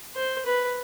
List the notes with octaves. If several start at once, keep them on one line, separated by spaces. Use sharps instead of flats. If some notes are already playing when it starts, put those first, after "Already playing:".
C5
B4